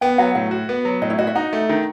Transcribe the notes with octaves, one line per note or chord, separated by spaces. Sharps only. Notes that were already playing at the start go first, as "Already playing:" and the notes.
B3 G5
F#3 F#5
A2 F#5
F#4
B3
F#3
A2 D#5
E4
F#4 D#5
E5
D#4 F#5
A3
D#3